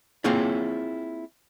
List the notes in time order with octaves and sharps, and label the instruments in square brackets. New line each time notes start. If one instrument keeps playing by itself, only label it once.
[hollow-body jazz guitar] A#3 C4 E4 F4 G#4 C#5